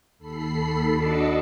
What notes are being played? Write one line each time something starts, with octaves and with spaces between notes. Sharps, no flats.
D#2 A4 B5 C7
D4 F#4 D#5 D6 E6 C#7